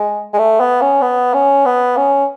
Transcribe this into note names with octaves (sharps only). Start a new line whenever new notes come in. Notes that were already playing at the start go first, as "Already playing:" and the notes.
Already playing: G#3
G#3
A3
B3
C#4
B3
C#4
B3
C#4